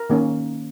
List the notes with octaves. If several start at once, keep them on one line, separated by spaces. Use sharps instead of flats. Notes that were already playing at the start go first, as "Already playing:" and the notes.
Already playing: A#4
D#3 A#3 C#4